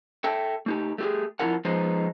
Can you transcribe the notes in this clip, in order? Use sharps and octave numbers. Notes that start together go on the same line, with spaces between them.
A4 E5 G5
A3 D#4 G4
A3 G4 G#4
F2 D#3 E4 F4 A#4 F#5
F3 G#3 B3 D#4 C5